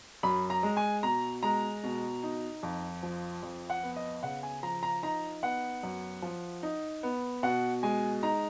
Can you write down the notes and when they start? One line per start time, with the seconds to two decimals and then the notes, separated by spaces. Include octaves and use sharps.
0.23 F#2 B5
0.50 A#5
0.63 G#3
0.77 G#5
1.03 B2 A#5
1.43 G#3 A#5
1.84 B2
2.23 D#4
2.63 F2
3.03 F3
3.43 F2
3.70 F#5
3.83 B3
3.96 D#5
4.23 C#3 F#5
4.43 G#5
4.63 F3 A#5
4.83 A#5
5.03 D#4 A#5
5.43 B3 F#5
5.83 F#2
6.22 F3
6.63 D#4
7.03 B3
7.43 B2 F#5
7.83 G#3 G#5
8.23 D#4 A#5